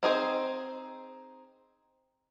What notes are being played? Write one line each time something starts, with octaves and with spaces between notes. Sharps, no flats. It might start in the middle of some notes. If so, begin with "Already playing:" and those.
C4 D#4 G#4 C5